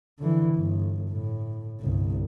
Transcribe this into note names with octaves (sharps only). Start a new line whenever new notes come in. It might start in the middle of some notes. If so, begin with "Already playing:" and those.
D3 E3
G1
A2
G1 C2